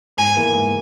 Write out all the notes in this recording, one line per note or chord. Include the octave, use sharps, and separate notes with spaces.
G#2 G#5
E3 A#3
G#2